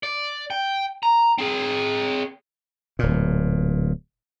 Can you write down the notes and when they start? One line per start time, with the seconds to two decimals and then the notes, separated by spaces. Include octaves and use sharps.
0.03 D5
0.50 G5
1.03 A#5
1.38 C4 G#4
2.99 D1 A#2